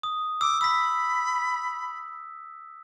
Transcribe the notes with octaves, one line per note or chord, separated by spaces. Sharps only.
D#6
D6 E6
B5 E6 B6